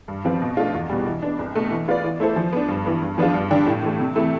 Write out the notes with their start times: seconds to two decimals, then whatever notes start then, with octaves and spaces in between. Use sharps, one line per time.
0.08 G2
0.25 F3 C4 F4 B4
0.42 B2
0.57 A3 D4 F4
0.73 E2
0.90 B2 G3
1.06 E3
1.22 B3 D4
1.39 C2
1.55 B2 A3
1.71 E3
1.88 B3 F4 B4 D5
2.04 E3
2.20 A3 E4 A4 C5
2.36 F3
2.53 B3 D4
2.68 G2
2.86 E3 B3
3.02 G2
3.18 F3 B3 D4 F4
3.34 G2
3.50 D3 G3 D4 G4
3.66 A2
3.83 E3 A3
4.00 C3
4.15 E3 A3 E4